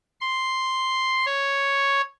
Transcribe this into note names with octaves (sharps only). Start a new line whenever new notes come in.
C6
C#5